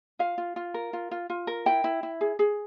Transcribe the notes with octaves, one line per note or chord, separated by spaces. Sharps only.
F4 F5
F4
F4
A#4
F4
F4
F4
A#4
E4 G5
E4
E4
G#4
G#4